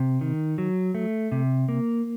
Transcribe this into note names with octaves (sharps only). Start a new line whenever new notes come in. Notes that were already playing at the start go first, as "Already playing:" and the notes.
Already playing: C3
D#3
F#3
A3
C3
A#3